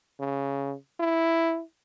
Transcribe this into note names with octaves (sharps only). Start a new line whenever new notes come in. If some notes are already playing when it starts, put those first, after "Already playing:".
C#3
E4